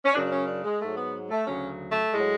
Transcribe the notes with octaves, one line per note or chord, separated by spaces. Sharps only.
C#4
F#2 C#3 F#3 D4
D4
C#4
D4
G#3
G#2 F#3 A3
B3
A3
D2 C#3 F#3 C#4
A3
A2 F#3 G#3